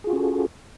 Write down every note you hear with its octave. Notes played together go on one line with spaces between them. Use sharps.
C#4 F4 F#4 G#4 A4